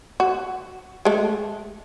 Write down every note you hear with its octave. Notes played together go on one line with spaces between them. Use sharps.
F#4
G#3 A3